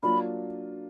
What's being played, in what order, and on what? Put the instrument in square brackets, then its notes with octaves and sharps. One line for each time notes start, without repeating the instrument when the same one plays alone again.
[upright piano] F#3 A#3 D4 F4 [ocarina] B5